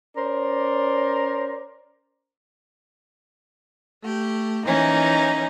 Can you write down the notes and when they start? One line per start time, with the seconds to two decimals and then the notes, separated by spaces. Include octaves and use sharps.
0.17 C#4 A#4 C5 D5
4.03 A3 G4
4.66 E3 A#3 C#4 D#4